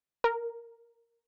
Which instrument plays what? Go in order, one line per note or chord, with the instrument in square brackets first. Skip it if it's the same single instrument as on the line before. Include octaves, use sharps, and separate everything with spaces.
[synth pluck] A#4